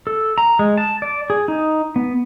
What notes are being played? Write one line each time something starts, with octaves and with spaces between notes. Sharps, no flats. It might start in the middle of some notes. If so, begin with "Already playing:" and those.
A4
A#5
G#3
A5
D5
G#4
D#4
B3